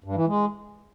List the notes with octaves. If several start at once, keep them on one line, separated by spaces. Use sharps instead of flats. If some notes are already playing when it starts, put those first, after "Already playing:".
G2
E3
G#3